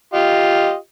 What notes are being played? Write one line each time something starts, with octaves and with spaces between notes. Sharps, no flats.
F4 G4 D#5